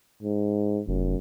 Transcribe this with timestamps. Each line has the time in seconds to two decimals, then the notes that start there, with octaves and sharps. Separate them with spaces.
0.23 G#2
0.88 F1 F#2